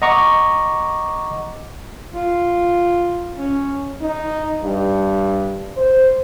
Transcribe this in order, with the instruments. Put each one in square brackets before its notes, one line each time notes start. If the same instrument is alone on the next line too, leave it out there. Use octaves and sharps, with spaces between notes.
[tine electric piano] D#5 F#5 A#5 C#6 D6
[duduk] F4
C#4
[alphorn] D#4
G2
C5